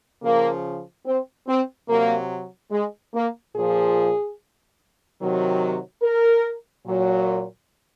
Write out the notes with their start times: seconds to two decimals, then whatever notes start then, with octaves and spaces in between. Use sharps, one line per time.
0.23 C#3 F3 A#3
1.05 C4
1.47 C4
1.88 C3 F#3 A#3
2.71 G#3
3.13 A#3
3.55 A#2 F3 G#4
5.20 C3 D#3 F#3
6.02 A#4
6.86 A#2 F#3